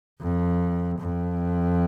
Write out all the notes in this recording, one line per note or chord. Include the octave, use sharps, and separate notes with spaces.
F2
F2